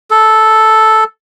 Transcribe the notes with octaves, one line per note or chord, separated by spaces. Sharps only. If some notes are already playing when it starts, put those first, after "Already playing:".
A4